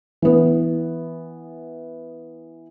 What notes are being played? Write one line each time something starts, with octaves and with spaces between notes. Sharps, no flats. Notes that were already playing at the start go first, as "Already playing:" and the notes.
E3 B3